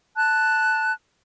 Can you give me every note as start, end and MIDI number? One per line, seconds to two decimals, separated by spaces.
0.16 0.92 81
0.16 0.92 90